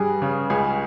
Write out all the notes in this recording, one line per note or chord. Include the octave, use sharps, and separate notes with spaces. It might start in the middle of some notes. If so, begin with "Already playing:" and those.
Already playing: G2 G3 G#4
C#3
C#2 G#4